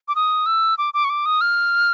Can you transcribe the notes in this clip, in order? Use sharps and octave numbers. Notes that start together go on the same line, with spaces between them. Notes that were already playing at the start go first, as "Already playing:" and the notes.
D6
D#6
E6
D6
D6
C#6
D6
D#6
F6